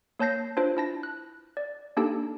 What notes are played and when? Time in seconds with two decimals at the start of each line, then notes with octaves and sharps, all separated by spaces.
0.19 A#3 C#5 A5 G6 A#6 C7
0.57 D4 F4 B4 C5
0.77 E4 A5 A#6
1.03 F#6
1.57 D5
1.97 A#3 D4 D#4 G4 A4 A5